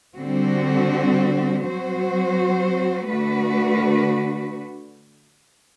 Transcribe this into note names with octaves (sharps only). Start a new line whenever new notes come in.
D3 G3 C4 F#4
F#3 C4 F#4 C5
D3 A3 D4 F#4 B4